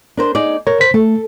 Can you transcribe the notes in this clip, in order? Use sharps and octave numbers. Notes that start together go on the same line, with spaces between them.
D4 A#4 C5
D#4 G#4 D5
A#4 C#5
C5 B6
A3 A4